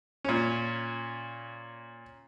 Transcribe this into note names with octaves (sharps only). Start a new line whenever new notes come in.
A#2 C#4